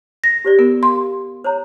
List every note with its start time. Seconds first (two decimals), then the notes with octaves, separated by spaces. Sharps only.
0.24 A#6
0.45 G4 C5 D5
0.59 B3 A#4
0.83 F5 C6
1.44 C5 C#5 A#5